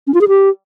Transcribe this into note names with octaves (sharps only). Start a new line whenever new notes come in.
C#4
F4
G#4
G4